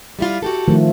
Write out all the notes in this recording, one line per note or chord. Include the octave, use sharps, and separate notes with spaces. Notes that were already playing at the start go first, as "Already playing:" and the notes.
G3 E4 F4
F#4 G4 A4
D#3 F3 A3